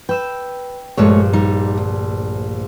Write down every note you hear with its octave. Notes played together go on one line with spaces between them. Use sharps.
B4 G5 E6 E7
A#1 G2 G#3 A3 C#5
G3 D#4
D2